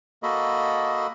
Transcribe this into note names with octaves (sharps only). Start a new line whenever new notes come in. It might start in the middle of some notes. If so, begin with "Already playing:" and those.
A#3 F#4 A4 D#5 B5